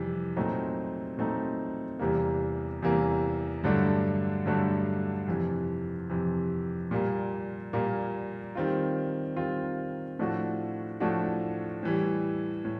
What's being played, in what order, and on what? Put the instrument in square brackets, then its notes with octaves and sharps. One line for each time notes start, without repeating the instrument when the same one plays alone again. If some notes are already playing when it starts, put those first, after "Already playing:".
Already playing: [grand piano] F2 C3 E3 G3
A#2 F#3 A3 C4 D#4
A#2 F#3 A3 C4 D#4
E2 C3 E3 G3 A#3
E2 C3 E3 G3 A#3
G2 D3 F#3 A3 D4
G2 D3 F#3 A3 D4
F2 C3 E3
F2 C3 E3
A#2 G3 A#3
A#2 G3 A#3
D#3 G3 C4 F4
D#3 G3 C4 F4
A2 F3 A3 D4 F#4
A2 F3 A3 D4 F#4
A2 E3 G3
A2